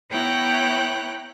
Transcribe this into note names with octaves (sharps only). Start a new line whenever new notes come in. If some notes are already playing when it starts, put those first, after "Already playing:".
B3 E4 C#5 G5 A#5 F#6